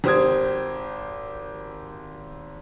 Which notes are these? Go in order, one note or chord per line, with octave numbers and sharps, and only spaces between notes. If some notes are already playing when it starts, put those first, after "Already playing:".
G#1 G4 C5 D#6 G#6